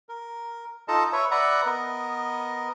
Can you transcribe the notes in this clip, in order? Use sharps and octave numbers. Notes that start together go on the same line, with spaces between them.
A#4
D#4 F4 A4 D#5 A5 A#5
B4 C#5 E5
B4 D5 E5 F#5 A#5
B3 A#4 D#5